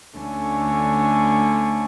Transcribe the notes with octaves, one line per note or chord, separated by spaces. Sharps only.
D2 D3 A3 C#4